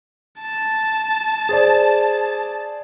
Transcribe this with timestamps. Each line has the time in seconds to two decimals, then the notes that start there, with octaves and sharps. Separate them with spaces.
0.40 A5
1.49 G#4 C5 D5